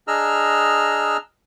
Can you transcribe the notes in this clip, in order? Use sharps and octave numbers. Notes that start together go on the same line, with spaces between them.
D4 G#4 D#5 A#5 E6 F6